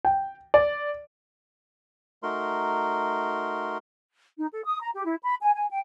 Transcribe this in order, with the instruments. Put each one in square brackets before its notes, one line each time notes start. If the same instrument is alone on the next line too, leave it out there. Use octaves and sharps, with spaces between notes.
[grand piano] G5
D5
[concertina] A3 D#4 F#4 A#4 C6
[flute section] D#4
A4
D#6
A#5
G4
E4
B5
G#5
G#5
G5